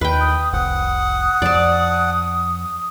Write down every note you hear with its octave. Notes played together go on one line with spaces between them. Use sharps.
D#2 B4 G5
D#6
F1 C2 F#5 D#6
F2 D5 A5